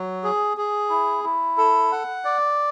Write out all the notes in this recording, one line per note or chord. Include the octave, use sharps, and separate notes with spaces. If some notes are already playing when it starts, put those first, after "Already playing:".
Already playing: F#3
G#4
G#4
E4
E4
A4
F#5
D5